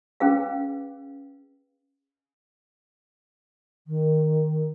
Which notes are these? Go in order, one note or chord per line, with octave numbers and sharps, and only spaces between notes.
C#4 G#4 B4 F5
D#3